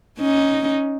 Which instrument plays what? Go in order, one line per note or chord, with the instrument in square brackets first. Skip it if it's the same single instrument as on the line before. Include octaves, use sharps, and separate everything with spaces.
[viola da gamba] C#4 D#4